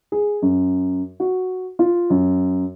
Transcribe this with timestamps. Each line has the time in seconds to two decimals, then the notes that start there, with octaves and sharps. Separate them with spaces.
0.12 G#4
0.42 F#2
1.20 F#4
1.79 F4
2.10 F#2